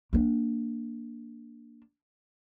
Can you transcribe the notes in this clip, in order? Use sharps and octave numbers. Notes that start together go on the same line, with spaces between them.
A#3 D4